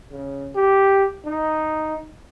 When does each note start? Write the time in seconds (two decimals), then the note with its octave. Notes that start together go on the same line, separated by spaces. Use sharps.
0.12 C#3
0.55 G4
1.25 D#4